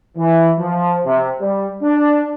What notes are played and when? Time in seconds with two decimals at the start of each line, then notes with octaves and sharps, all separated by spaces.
0.17 E3
0.59 F3
1.05 C3
1.40 G3
1.83 D4